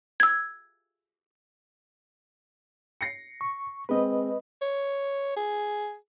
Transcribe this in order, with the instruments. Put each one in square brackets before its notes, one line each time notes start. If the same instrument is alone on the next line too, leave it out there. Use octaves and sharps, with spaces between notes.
[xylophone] E6 G#6
[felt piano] A#6 C7 C#7
[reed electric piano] C#6
[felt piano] G#3 C4 [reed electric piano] B4 D#5
[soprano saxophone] C#5
G#4